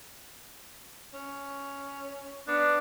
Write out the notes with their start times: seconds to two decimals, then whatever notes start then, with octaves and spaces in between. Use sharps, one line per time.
1.13 C#4
2.48 B3 D4